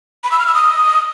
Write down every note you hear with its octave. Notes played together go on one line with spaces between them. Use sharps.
B5
E6
F6
E6
D#6